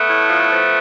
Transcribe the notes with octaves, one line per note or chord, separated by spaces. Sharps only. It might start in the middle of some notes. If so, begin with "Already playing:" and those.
Already playing: A3 B3
A2
F3
F3